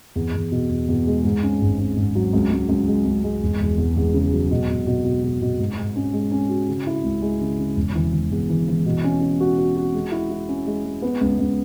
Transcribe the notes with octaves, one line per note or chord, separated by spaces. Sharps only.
E2
E2
B2
E2
E2
G#3
G#2
C#4
G#1
C#4
G#2
F#3
C#2
C#2
C#2
G#3
C#2
G#3
E1
E2
E2
E2
C#3
F#3
B2
B2
B2
B2
B2
B2
G#2
G#2
C#4
G#3
C#4
F#4
C#3
E4
C#2
G#3
C#3
C#3
E1
E3
E3
E2
E3
E3
B2
C#4
C#4
F#4
F#4
F#4
G#3
E4
E4
C#4
G#3
G#3
B3
C#2
C#2